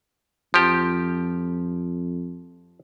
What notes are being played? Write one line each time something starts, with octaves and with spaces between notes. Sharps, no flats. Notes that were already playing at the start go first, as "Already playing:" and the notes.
F2 F3 G4